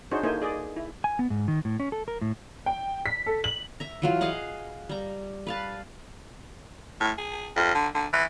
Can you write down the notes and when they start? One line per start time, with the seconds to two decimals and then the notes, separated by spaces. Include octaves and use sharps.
0.11 D4 D#4 F#4 G#4 C5 C#5
0.23 A#3 D#4 E4 A4 C5 G#5
0.42 G#4 D5 D#5
0.77 E4
1.04 G#5
1.19 B3
1.30 G#2
1.48 D#3
1.65 A2
1.80 C#4
1.92 A4
2.08 A#4
2.21 A2
2.66 G5
3.06 B6
3.26 A4
3.44 F#7
3.80 E5 A#5
4.02 E3 F#3 F4
4.21 G#4 D#5 F5 F#5
4.89 G3 A#5
5.47 B4 F5 A5
7.01 A2
7.18 G#4
7.56 F2
7.75 D3
7.95 D3
8.13 E3